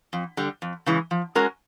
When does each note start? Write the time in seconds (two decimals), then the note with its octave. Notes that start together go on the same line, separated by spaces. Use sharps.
0.13 F2
0.37 D3 G3
0.62 F2
0.86 C#3 E3 G#3
1.11 F3
1.35 G#3 C#4 F#4 A#4